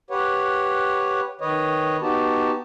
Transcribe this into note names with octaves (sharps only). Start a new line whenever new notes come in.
G4 B4 C#5 F#5
D#3 B4 C#5 D#5
B3 D#4 F#4 G4 A5